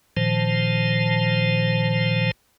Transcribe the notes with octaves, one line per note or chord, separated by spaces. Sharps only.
A#2 D#3 F3 C5 A5